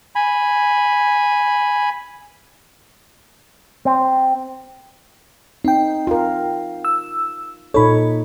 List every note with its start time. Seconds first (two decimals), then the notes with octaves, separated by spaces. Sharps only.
0.15 G#5 B5
3.85 C4
5.65 C4 D#4 G5
6.07 F4 A#4
6.85 E6
7.74 A#2 D#4 A4 C#5 B5